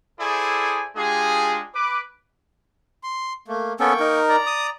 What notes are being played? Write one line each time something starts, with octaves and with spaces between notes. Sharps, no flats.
E4 G#4 A4 C5 D5 G#5
G#3 D4 F4 G4 G#4
B4 D6
C6
A3 A#3
A#3 B3 C#4 A4 G5 C#6
D#4 A#4
D5 A#5
D#6